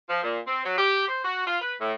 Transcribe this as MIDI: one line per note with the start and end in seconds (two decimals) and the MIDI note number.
0.10 0.19 53
0.23 0.39 46
0.47 0.63 60
0.65 0.76 54
0.78 1.06 67
1.08 1.24 72
1.25 1.45 66
1.47 1.61 65
1.61 1.75 71
1.81 1.93 45